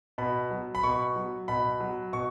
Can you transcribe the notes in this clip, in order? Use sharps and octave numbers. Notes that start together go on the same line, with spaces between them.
B2 B5
F#3
B5
B2 C#6
F#3
B2 B5
F#3
B2 C#6